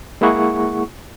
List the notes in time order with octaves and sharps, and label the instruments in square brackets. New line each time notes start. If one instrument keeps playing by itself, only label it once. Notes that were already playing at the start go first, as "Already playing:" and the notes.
[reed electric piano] G#3 A#3 E4 G#4 F#5 C#6